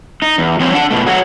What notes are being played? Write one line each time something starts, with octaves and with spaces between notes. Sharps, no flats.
D#4
E2
F3 C4 C#5
D4 F#5 A5
B2 A3
F#4 A4 C#5 F#5